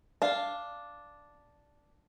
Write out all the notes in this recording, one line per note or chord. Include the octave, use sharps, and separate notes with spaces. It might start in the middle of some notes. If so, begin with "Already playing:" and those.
D4 F5